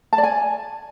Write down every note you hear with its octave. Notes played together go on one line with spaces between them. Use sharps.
A5
D5
G#5